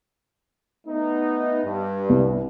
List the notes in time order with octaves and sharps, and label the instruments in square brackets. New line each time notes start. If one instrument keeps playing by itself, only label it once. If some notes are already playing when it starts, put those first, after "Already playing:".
[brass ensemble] A3 B3 D#4
G2
[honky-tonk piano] C2